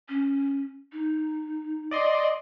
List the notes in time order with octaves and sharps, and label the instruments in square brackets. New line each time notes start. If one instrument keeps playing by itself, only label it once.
[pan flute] C#4
D#4
[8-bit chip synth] D5 D#5 C6